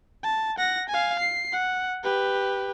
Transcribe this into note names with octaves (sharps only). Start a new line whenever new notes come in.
A5
F#5 A#6
F5 G#5
C7
F#5
G4 B4